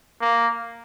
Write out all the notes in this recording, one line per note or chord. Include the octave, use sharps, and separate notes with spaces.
A#3